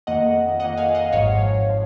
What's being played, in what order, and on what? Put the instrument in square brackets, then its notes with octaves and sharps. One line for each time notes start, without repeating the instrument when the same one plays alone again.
[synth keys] F2 D#3 A#3 D#5 F#5
F2 D#3 A#3 D#5 F#5
F5 G#5
D#5 F#5
G#1 G#2 F3 C#5 F5
F3